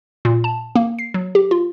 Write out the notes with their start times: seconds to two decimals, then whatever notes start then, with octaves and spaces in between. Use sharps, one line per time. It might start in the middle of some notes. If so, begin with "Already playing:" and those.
0.25 A#2
0.44 A5
0.76 A#3
0.99 C7
1.14 F#3
1.35 G4
1.51 F4